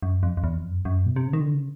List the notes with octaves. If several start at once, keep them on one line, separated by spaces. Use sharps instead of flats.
F#2
F2
F2
E2
F2
F#2
F#2
B2
C3
C#3
D#3
D3
C#3